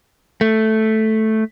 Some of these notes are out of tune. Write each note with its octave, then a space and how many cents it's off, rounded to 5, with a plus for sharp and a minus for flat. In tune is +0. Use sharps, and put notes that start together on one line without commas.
A3 -5